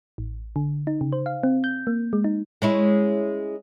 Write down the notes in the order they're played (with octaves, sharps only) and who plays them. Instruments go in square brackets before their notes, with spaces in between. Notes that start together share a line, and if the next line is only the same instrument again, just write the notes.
[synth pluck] A1
D3
D#4
C#3
C5
F5
C4
G6
A#3
G#3
D#4
[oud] G#3 C#4 E4